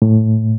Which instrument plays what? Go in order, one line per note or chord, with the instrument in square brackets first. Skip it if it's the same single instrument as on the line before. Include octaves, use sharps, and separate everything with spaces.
[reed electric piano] A2